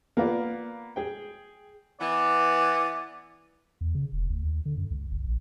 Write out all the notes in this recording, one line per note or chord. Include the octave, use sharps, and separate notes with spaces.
A#3 B3 F4 D5
G#4 G5
E3 B3 D5
E2
C#3
E1
D2
D#2
D3
F#2
C#2
G1
A#1